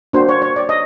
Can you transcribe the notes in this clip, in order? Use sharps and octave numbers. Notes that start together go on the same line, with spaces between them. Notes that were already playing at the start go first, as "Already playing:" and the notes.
A#3 D4 F#4 C5
C#5
C#5
D5
D#5